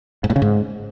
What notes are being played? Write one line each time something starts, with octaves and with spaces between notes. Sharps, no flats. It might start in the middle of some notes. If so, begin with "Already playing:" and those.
G#2
A2
C#3
G#2